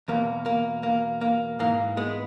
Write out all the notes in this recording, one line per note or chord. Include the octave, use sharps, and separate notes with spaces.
E2 B2 A#3
A#3
A#3
A#3
G#2 E3 A#3
G#3 B3